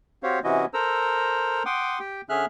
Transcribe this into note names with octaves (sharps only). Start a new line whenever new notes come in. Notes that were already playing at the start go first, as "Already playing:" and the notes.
C4 F#4 G4 C5 C#5 F5
C3 E3 C#4 E4 F#4 D#5
A4 A#4 C5 A#5 E6
F#5 G5 C6 D6 D#6
G4 G5
D3 C#4 G#4 E5 F6 F#6